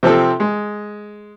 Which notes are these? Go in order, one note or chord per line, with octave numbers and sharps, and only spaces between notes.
C3 F3 C4 A4
G#3